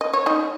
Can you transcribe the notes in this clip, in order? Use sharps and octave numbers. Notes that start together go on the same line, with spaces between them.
D#5
C#5
D#4 D#5